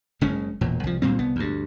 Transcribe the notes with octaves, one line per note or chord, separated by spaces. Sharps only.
F#1 C#3 G#3 C#4
E1 A#2
C2 F3
D2 A#2 G3 C4
C2 B3
D2 G2